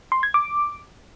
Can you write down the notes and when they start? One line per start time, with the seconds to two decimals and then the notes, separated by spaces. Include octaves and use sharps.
0.12 C6
0.23 G#6
0.34 D6